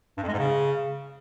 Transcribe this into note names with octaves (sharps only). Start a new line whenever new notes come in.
G2
F2
G#3
G#2
C#3